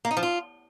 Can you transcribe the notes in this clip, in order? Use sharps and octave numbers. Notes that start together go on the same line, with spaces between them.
A#3
D#4
F3
F4